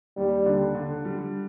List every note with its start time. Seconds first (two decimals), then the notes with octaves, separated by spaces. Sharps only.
0.17 D#2 G3
0.46 D3
0.75 D3
1.05 G3